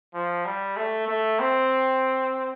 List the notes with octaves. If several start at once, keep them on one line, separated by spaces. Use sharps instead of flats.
F3
G3
A3
A3
C4